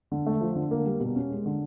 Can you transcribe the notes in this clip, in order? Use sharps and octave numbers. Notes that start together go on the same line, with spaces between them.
D3
A3
F3
D3
A#3
G3
B2
C#4
G#3
D3